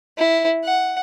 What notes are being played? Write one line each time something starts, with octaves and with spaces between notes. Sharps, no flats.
E4
F#5